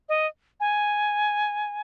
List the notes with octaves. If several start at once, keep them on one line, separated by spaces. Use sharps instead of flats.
D#5
G#5